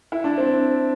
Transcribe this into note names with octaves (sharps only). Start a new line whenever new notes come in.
E4
D4
C4